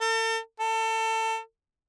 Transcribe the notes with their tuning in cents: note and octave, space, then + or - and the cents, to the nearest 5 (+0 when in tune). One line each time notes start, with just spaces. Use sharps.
A4 +40
A4 +25